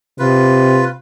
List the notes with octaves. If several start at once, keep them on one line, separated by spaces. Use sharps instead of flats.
C3 F4 B4